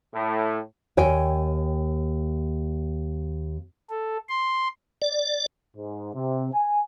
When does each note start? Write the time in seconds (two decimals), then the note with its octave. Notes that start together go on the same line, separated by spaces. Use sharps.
0.14 A2
0.97 D#2 C#5 G5 G#5
3.90 A4
4.29 C6
5.02 D5
5.76 G#2
6.14 C3
6.53 G#5